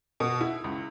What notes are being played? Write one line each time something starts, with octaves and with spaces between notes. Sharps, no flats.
B2
E4
C#2